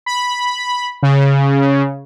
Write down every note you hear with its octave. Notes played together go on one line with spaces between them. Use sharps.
B5
C#3